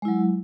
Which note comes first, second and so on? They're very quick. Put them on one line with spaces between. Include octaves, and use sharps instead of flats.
G#3 E4 F#3